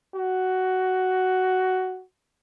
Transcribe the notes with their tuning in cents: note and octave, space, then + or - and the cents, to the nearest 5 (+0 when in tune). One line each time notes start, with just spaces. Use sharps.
F#4 +10